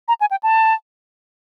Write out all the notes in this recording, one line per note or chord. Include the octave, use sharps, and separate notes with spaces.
A#5
G#5
G5
A5